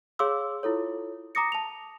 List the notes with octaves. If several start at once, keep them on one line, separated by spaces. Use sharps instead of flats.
G#4 C#5 F5 C6 D6 E6
E4 F4 A4 C#5
A#5 D6 D#6 A#6 C#7
A5 F7